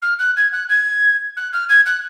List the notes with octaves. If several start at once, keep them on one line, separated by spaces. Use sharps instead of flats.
F6
F#6
G#6
F#6
G#6
F#6
F6
G#6
F#6